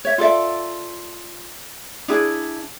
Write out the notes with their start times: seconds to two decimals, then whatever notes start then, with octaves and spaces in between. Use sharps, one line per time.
0.05 C#5 E5
0.18 F4 A4 D5 E5
2.08 D4 E4 G#4